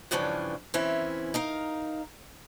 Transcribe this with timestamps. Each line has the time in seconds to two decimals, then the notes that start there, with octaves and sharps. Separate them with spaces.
0.11 G2 C#3 E3 F3 C#4 D4
0.74 E3 C4 C#4 E4
1.34 D#4 A#4 F5